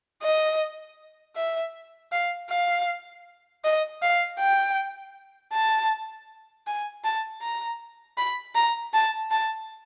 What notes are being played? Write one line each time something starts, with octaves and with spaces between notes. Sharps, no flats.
D#5
E5
F5
F5
D#5
F5
G5
A5
G#5
A5
A#5
B5
A#5
A5
A5